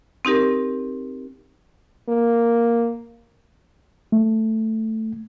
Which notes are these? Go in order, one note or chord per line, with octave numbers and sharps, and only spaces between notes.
C4 D#4 G4 A#4
A#3
A3